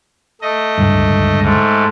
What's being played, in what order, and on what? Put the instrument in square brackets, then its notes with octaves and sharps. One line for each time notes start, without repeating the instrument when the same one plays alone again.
[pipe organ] A3 D#5
[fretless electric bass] D1 C#2 G2
[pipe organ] G#2 A3